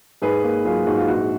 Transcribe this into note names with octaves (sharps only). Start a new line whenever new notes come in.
G#2 G#4 B4
A#3
F#3 F4 G#4
G#2 F#4
F4
A#1 F#4